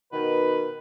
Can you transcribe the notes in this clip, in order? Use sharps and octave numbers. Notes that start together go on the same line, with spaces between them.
B2 D#3 B4